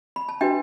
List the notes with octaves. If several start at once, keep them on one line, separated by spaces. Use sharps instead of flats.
B5
A5
D4 F#4 B4 E5 G5